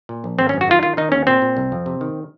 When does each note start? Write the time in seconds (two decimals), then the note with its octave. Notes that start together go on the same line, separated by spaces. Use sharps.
0.09 A#2
0.24 A#1
0.39 G#1 C4
0.49 C#4
0.54 F#2
0.61 F#4
0.68 D#3 F4
0.83 D#3 F4
0.97 D#3 D#4
1.12 D#2 C#4
1.27 A#2 C4
1.42 A#2
1.57 C2
1.72 F2
1.86 C3
2.01 D#3